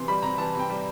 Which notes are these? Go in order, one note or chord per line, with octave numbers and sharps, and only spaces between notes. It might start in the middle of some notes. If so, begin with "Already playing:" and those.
Already playing: C3 E3 C6
G3 B5
C3 A#5
E3 A5
C3 G5
G3